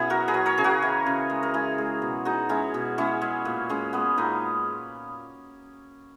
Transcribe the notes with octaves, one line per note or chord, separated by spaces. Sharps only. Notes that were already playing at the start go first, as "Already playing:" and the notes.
Already playing: B2 C#4 E4 G#4
F#3 F#4 A#4
G#4 B4
F#3
A#4 C#5
C#3 G#4
F#4 A#4
E3
C#3
G#3
A#4
G#3 E4 G#4
G#3
B2
G#3 D#4 F#4
G#3 C#4 E4
B2
G#3 C#4 E4
G#3
A#2
G#3 C#4
G#3 B3
A#2 B3 D#4